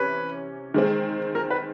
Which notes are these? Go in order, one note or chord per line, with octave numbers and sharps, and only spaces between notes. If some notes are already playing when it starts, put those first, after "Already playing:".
Already playing: C3 E3 C#4 B4
D#3 G#3 C4
A#4
B4